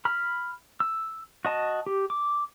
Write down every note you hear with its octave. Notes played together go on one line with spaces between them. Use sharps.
B5 F6
E6
F#4 D#5 A5
G4
D6